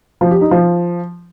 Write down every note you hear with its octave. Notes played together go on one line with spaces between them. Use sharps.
F3
G4
D#4
F3